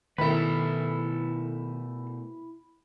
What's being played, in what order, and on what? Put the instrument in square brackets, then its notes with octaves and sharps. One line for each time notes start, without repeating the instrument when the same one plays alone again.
[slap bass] B2 A3 [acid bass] D#3 [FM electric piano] E4 B5 [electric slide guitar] A4 B4